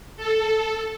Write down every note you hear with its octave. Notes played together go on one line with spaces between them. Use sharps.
A4